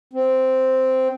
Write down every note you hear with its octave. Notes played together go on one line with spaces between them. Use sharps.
C4